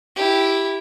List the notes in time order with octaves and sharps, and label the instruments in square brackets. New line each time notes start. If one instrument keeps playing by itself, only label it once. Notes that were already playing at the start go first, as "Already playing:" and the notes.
[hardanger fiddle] E4 G4